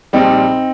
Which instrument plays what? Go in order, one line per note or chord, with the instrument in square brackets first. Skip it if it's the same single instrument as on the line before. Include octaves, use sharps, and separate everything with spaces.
[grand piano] A#1 A#2 G3 C4 D#4